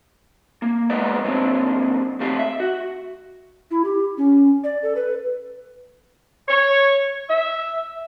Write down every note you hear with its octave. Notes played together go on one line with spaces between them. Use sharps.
A#3
G#3 B3 A#4 B4 D5
F#2 A#2 C4 D4
F2 C#3 A3 C4 G4 F5
E5
F#4
E4
G4
C#4
D5
A4
B4
C#5
E5